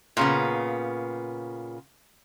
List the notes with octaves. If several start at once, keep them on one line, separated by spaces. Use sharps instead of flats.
A#2 C#3 B3